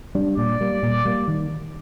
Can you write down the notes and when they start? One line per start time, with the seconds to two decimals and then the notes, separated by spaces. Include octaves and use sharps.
0.15 G3 D4
0.37 A#2 D5
0.61 G3 A#3
0.83 A#2
1.05 G3 A#3
1.27 D#3